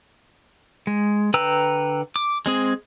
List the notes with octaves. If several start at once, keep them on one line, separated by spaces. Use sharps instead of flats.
G#3
D3 B4 G5 A#5 E6
D6
G#3 C4 G#4